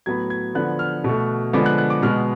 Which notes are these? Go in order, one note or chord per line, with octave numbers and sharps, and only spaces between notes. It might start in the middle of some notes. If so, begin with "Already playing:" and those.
A2 F#3 B3 G#6
G#6
D3 F3 B3 F#6
F6
B2 A3
D3 F3 G#3 B3 D6
F#6
F#6
D6
B2 G#3 B3 F6